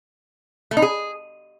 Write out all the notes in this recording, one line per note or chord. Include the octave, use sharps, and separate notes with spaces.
A3
D#4
G#4